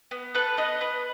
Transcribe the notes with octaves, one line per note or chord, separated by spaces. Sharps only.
B3
A4 B4
B3 D#5
B3 B4